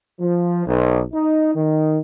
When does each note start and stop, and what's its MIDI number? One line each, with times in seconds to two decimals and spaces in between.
0.20 0.62 53
0.66 1.01 35
1.13 1.51 63
1.55 1.98 51